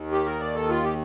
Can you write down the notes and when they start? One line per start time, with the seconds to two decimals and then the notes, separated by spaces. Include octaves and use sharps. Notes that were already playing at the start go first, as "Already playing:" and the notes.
Already playing: D#2 D#3
0.12 G4
0.26 A#4
0.40 D5
0.55 A4
0.69 F4
0.84 G4